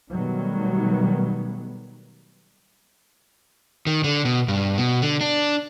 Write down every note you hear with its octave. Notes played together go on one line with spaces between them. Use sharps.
B2 D#3 F#3 G3 A3 B3
D#3
D3
B2
G2
B2
D3
D4